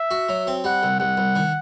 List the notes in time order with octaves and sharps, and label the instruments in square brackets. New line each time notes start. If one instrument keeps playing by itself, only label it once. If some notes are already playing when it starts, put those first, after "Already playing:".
Already playing: [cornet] E5
[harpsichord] F#4
F#3
C4
[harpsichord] G3 [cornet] F#5
[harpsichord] C2
[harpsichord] C2 [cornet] F#5
[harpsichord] C2
D#3